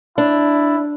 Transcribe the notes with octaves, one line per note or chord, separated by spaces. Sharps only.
D4 E4